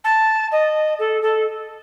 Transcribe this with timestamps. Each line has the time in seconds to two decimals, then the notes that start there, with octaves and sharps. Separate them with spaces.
0.04 A5
0.51 D#5
0.99 A4
1.21 A4